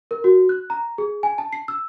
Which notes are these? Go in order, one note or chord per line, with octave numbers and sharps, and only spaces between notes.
A#4
F#4
F#6
A#5
G#4
G#5
A5
C7
E6